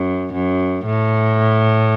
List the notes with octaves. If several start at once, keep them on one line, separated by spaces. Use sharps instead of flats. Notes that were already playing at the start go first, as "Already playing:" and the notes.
Already playing: F#2
F#2
A2